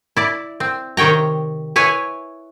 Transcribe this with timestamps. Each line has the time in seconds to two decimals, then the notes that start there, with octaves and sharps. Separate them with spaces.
0.17 E4 D5
0.60 C4
0.97 C3 D#3 C#5 G5 A#5
1.76 E4 B4 C#5 G#5